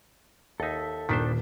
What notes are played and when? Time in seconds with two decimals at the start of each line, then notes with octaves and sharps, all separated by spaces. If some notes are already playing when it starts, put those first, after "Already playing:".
0.60 D#2 D#4 A4 E5
1.09 D#1 D#3 D4 C5 B6